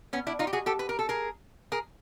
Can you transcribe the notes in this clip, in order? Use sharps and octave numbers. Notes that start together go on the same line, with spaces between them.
B3 C#4
D4 E4
D#4 F4
G4
F#4 G#4
G4 A4
B4
A#4
A4
G#4 A#4
G#4 A#4